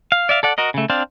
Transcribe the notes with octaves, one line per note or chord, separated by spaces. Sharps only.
F5
D5 E5 F5
A4 D5 F#5
F#4 A#4 D#5
C#3 A3
C4 D4 C5 D5 F5